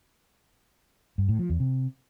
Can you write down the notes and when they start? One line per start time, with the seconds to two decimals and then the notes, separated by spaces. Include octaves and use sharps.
1.18 G2
1.29 A2
1.39 F3
1.50 E2
1.60 C3